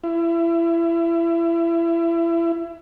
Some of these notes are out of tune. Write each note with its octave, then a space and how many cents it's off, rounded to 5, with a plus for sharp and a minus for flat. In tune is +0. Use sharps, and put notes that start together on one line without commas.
E4 +30